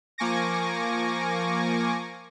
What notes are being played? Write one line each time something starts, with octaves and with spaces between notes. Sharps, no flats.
F3 A#3 G#5 C#6 D6 A#6